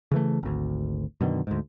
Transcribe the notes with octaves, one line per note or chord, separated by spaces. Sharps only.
C#3 E3 A3
G#1 D2
F#2 B2 D3 D#3
D2 G#2